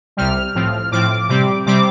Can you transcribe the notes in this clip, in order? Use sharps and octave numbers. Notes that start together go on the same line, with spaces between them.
C2 C3 G3 F6
A2 F3 C4
A2 F3 C4 D6
C3 G3 C4 D6
C3 G3 C4 D6